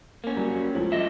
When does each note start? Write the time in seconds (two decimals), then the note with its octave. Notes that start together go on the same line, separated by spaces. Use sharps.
0.24 A#3 C#4
0.36 F#3 G3
0.74 C#2 F3 A3
0.92 G2 D#5 E5